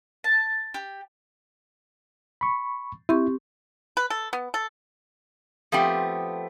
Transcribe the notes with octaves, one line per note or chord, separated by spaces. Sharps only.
A5
G4
B5 C#6
C4 E4 G4 C#6
B4
A4
B3
A4
F3 A3 B3 C4 G4